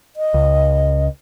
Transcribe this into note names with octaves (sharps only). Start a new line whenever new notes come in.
D#5
C#2